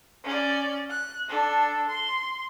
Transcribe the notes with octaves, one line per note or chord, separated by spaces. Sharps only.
C#4 D5
F#6
D4 A4
C6